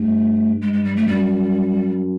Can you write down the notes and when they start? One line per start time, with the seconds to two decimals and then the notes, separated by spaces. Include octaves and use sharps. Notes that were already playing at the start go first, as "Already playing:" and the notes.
Already playing: G2 A3
0.61 G2 G#3
0.73 G#3
0.84 G3
0.96 A3
1.07 F#2 G3